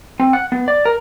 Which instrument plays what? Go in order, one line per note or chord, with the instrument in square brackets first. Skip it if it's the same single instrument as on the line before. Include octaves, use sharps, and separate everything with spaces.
[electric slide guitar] C4
F#5
B3
D5
A#4